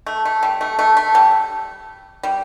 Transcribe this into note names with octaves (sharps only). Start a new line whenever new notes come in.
A3
A3
G3
A3
A3
A3
G3
G3